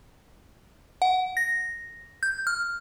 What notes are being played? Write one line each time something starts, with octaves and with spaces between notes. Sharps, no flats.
F#5
A#6
G6
F6